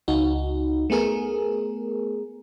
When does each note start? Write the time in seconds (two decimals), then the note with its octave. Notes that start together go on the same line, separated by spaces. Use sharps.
0.08 C#2 D#4 F#4
0.90 A3 B3 G#4 A#4